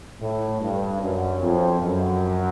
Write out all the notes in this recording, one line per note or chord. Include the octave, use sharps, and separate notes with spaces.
A2
G2
F#2
F2
F#2